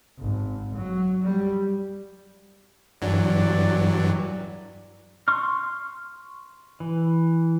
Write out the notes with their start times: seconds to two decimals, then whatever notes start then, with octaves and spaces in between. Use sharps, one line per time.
0.19 G#1
0.75 F#3
1.22 G3
3.02 G2 E3 F#3 D5
5.28 C6 C#6 F6
6.80 E3